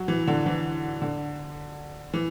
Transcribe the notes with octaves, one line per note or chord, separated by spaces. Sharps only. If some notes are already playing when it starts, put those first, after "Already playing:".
Already playing: F#3
E3
D3
E3
D3
E3